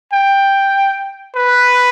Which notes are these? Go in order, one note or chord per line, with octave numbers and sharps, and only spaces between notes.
G5
B4